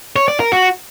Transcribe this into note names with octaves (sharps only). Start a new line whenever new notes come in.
C#5
D5
A#4
F#4